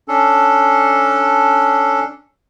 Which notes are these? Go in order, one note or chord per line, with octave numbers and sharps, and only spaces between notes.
C#4 D4 A4